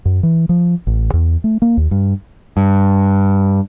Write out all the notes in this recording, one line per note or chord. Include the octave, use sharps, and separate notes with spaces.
F#2
E3
F3
A1
E2
A3
A#3
D#2
G2
G2